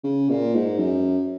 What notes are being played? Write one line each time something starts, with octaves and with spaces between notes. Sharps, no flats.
C#3
A#2
G#2
F#2